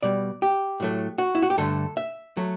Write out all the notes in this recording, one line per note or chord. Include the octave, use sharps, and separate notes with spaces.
B2 G3 D5
G4
A2 F#3 A3
F#4
E4
F#4
G4
G2 D3 A3 A4
E5
F#3 A3